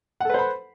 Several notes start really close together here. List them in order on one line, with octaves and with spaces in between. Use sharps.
F#5 A4 B4 C5 B5